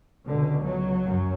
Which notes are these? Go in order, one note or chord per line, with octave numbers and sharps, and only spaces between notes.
C#2 B2 D3
F#3
F#2